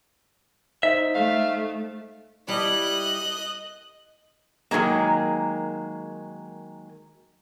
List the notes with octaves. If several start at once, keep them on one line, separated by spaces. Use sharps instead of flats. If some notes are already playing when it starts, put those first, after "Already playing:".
D#4 C5 E5
A3 F5
G3 E4 A4 D#5 F#6
D#3 E3 F#3 G#3 A#3